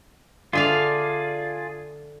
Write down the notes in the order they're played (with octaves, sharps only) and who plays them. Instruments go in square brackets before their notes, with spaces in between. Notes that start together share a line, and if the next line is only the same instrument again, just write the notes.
[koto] D3 E5 F5 [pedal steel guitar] F4 G#4 D5